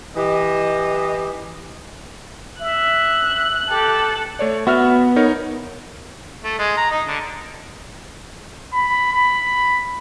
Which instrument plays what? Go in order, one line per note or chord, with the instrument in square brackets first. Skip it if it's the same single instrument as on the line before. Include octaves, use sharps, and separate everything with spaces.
[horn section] E3 G4 D#5
[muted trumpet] E5 [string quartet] F#6
[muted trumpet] G4 [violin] A4
[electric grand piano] A3 C#5 D5
[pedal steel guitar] B3 [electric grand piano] F#4 E5 F6
[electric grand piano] D#4 A#4 C#5
[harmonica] A3
G#3
A#5
D#4
D3
[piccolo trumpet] B5
B5